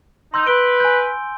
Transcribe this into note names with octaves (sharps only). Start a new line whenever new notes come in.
D#4 C6 E6 G6
B4 D7 G7
G#5 G6